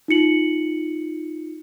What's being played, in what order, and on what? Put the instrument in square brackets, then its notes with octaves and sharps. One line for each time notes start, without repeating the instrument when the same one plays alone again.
[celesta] D#4 F4 C#7 F#7